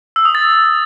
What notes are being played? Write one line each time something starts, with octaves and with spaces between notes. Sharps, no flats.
E6
D#6
A6